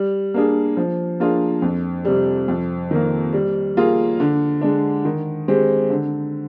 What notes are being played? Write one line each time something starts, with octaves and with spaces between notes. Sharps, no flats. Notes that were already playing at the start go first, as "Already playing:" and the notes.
Already playing: G3
A#3 D4 G#4
F3
A#3 D4 F4 G#4
F2
C3 G3
F2
D#3 A#3
G3
A#3 F4 G#4
D3
G#3 D4
D#3
G#3 C4 G4
D3